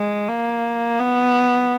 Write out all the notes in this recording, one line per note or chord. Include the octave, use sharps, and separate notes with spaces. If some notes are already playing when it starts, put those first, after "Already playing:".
Already playing: G#3
A#3
B3